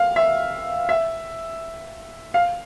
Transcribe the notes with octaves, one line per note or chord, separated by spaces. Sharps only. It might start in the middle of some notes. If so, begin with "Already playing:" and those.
Already playing: F5
E5
E5
F5